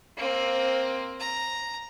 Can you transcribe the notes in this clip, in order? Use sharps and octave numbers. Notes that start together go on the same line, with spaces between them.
A#3 C4
A#5